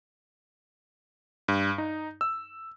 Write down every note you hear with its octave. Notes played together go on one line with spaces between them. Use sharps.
G2
D#4
E6